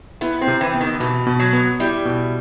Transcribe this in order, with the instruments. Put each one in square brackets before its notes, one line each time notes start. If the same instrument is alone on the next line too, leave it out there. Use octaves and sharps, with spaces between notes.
[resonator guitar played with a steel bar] B3 [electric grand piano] E4
[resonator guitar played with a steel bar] C4
[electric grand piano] C3
[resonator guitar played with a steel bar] E3
[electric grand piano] B3
[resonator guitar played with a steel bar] D#3
[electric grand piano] B2 [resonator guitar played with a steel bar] E3
[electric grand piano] B2
[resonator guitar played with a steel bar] F#3
[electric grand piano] B3
[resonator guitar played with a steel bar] G3 [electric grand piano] E4
[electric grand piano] B2